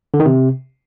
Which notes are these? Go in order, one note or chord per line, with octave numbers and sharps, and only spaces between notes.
D3
D#3
C3